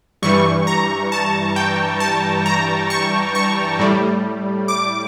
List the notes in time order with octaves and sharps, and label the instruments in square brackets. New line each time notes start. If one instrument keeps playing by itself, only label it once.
[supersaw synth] G2 E3 G3 C#6
A#5
A5
G5
A5
A#5
C#6
C#6
A2 G3
D6